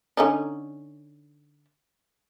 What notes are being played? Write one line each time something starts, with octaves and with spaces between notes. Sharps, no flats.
D3 C#4 D#4